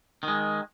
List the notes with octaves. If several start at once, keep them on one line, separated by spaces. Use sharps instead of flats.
D#3 G#3